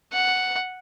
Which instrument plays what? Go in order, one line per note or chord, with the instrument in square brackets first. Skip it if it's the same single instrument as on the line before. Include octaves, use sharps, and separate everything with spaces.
[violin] F#5